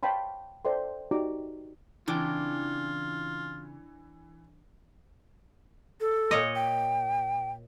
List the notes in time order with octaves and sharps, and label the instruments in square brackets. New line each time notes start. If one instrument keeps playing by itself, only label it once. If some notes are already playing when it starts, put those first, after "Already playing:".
[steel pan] C#5 F5 G5 A5 B5 C6
A4 C5 D5 E5 G5 C6
D#4 F#4 G4 D5 A#5 D6
[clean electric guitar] C#3 C4 G5 [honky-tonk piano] E3 [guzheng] D4 [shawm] F4
[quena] A4
[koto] A#2 C#5 D#5
[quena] G5